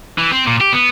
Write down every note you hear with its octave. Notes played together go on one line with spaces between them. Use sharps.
E3
C4
A#2
G4
B3